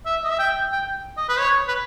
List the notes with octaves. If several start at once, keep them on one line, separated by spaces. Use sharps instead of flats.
E5
D#5
E5
G5
G5
D#5
B4
C#5
B4